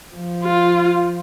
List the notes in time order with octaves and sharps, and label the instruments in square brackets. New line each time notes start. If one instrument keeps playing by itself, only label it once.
[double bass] F3
[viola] F4